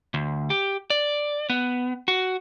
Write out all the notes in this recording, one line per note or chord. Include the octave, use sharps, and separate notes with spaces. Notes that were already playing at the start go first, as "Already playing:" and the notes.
D2
G4
D5
B3
F#4